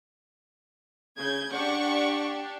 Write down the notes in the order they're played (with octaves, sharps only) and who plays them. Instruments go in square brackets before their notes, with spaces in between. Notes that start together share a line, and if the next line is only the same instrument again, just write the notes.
[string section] C#3 [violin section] G6 G#6
[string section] D4 G4 [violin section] D5 F#5 C#6